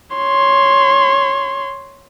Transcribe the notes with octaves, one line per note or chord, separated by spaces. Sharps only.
C#5 C6